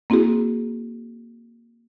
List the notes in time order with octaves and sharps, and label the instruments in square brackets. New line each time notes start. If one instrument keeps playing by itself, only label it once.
[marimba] A#3 C4 E4 F#4 G#4